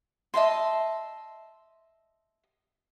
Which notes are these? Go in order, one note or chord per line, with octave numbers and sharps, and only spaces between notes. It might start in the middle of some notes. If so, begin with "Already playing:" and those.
D#5 E5 A5 C6